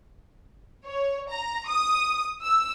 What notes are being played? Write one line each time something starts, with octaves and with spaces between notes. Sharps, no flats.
C#5
A#5
D#6
E6